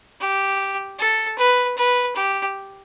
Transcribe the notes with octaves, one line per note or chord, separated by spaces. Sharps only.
G4
A4
B4
B4
G4